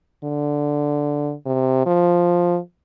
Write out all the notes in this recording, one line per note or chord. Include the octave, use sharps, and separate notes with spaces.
D3
C3
F3